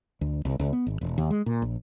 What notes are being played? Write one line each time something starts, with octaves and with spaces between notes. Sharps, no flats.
D2
C2
C#2
B3
G#1
E1
D#2
G#3
A#2
A#1